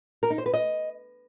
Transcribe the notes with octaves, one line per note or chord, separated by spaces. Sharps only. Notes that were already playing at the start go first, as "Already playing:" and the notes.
A#4
D#4
C5
B4
D#5